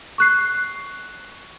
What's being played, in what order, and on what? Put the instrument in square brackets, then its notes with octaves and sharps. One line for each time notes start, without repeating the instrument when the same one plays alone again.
[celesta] C#6 F#6 C7